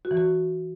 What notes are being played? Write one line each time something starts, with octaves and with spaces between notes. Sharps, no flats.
F#4
E3
F#4